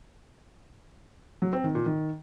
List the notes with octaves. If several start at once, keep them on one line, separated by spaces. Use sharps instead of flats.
F#3
C4
D#3
A#2
D#3